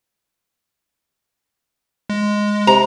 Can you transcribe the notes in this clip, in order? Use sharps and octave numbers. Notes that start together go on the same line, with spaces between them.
G#3
C3 A#5